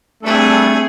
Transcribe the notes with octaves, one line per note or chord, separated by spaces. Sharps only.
G3 A3 C4 D4 G#4 A4